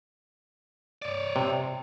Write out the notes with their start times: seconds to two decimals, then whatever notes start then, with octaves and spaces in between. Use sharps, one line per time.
1.02 C#5 D5
1.36 C3